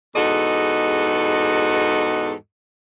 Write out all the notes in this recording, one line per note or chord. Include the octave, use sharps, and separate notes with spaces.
E2 G#2 F#4 A4 D#5